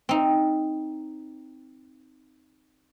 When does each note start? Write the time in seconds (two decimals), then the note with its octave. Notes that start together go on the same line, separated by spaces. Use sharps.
0.09 C4 D#4